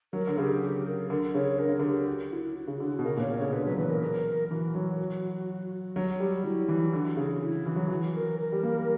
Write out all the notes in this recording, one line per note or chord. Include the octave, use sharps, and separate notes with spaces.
F#3 A#4
D3
C#3 G4
G4
A#4
D3 A#4
C#3 C#5
D3 A#4
C#3
D3 G4
F#4
E4
F#4
C#3
D3 F#4
D3
B2
C#3 A#4
A#2
C#5
B2
C#3 C#5
D3 B4
F#3 B4
E3 B4
A#4
E3 F#4
F#3
F#3
G3
F#3 E4
E3
D3 F#4
C#3
E4
E3 F#4
F#3
E3 F#4
A#4
A#4
G3
A#3